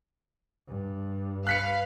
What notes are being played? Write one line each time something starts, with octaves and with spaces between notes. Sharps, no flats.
G2
B4 F5 F#6 B6 C#7